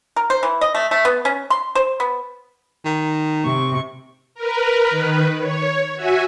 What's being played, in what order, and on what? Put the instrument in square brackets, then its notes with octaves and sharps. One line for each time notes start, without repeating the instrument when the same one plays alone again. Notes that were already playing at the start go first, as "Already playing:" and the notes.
[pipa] A#4
C5
E3
D#5
A3
A3
B3
C#4
C6
C5
B3
[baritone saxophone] D#3
[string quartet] C3 C#6
[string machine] A#4 B4
D#3 B4
C#5
F#4 E5 G#5